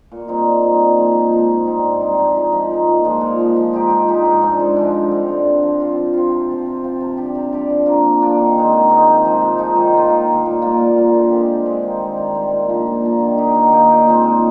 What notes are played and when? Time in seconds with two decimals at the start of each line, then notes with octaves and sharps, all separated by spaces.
0.11 A#2
0.28 G3 C4 D#4
0.46 A#2
0.63 G3 C4 D#4
0.80 A#2
0.98 F3 G#3 D#4
1.15 A#2
1.32 F3 G#3 D#4
1.50 G#2
1.66 G3 C4 D#4
1.83 G#2
2.01 G3 C4 D#4
2.18 F3
2.35 G#3 D#4
2.52 F3
2.70 G#3 D#4
2.87 A#2
3.05 F3 G#3
3.21 A#2
3.39 F3 G#3
3.56 F3
3.73 G#3 D#4 G4
3.90 F3
4.08 G#3 D#4 G4
4.25 G#2
4.41 F3 G#3 D4
4.60 G#2
4.76 F3 G#3 D4
4.94 D3
5.11 G3 C4
5.28 D3
5.46 G3 C4
5.62 F3
5.80 C4 F4
5.97 F3
6.14 C4 F4
6.32 C3
6.49 F3 C4 F4
6.66 C3
6.83 F3 C4 F4
7.01 C3
7.17 G3 D4 G4
7.35 C3
7.52 G3 D4 G4
7.70 F3
7.86 A#3 D4
8.04 F3
8.22 A#3 D4
8.38 D#3
8.55 G#3 C4 D#4
8.72 D#3
8.90 G#3 C4 D#4
9.07 C3
9.24 F3 G#3 D#4
9.41 C3
9.58 F3 G#3 D#4
9.76 D#3
9.94 A#3 F4
10.10 D#3
10.28 A#3 F4
10.46 A#2
10.62 G3 A#3 F4
10.79 A#2
10.97 G3 A#3 F4
11.14 D3
11.31 G#3 C4 G4
11.48 D3
11.66 G#3 C4 G4
11.83 D#3
12.00 G3 C4
12.18 D#3
12.35 G3 C4
12.51 A#2
12.69 F3 A#3 D4
12.87 A#2
13.03 F3 A#3 D4
13.20 D#3
13.38 A#3 D#4 G4
13.55 D#3
13.72 A#3 D#4 G4
13.90 A#2
14.07 G#3 C4 D#4
14.23 A#2